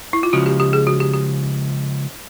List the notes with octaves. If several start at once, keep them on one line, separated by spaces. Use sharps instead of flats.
E4
F4
C#2 C#3 F3 F#4
G4
G4
G#4
F#4
G4
G4